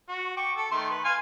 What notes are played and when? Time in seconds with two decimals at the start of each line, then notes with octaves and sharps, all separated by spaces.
0.09 F#4
0.37 G5 C#6 D6
0.56 A4
0.72 D#3 A3 C6
0.90 B4
1.05 F5 G#5 C6